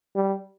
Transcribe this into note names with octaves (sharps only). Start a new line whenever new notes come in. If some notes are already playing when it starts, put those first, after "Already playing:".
G3